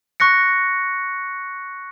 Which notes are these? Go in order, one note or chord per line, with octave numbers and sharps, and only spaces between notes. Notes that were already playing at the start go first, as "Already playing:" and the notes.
C#6 F#6 A#6 C#7